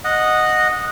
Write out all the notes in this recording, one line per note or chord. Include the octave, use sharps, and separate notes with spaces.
D#5 F#5